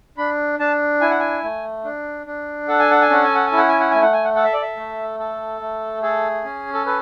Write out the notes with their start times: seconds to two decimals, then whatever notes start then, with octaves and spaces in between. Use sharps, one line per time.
0.18 D4 B5
0.59 D4 A5
1.01 E4 G#5
1.10 F#5
1.20 G#5
1.43 A3
1.84 D4
2.26 D4
2.68 A4 F#5
2.79 G#5
2.91 F#5
3.01 G#5
3.10 C#4 F#5
3.24 G#5
3.35 F#5
3.47 G#5
3.52 E4
3.57 F#5
3.68 G#5
3.80 F#5
3.91 A3 G#5
4.02 F#5
4.13 G#5
4.24 F#5
4.35 A4 F#5
4.44 E5
4.53 D5
4.62 E5
4.77 A3
5.19 A4
5.61 A3
6.02 G#4 A4
6.45 C#4
6.74 A4
6.86 A4 B4